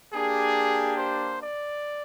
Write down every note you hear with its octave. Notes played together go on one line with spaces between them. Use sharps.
A#3 D4 G4 G#4
C5
D5